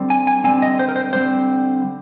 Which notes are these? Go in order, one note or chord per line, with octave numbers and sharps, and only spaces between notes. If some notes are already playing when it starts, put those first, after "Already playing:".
Already playing: D3 G3 C4
G#5
G#5
D3 G3 C4 G#5
D#5
C5
A#4
C5
D3 G3 C4 C5